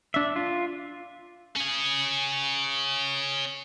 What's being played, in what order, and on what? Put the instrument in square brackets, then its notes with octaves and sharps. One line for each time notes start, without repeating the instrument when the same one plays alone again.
[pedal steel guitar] D4 E5
F4
[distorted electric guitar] C#4 G#4